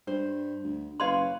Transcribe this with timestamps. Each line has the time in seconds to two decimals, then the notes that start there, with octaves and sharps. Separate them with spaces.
0.07 G2 C5
0.63 D2
1.00 F#1 B4 C#5 F5 C6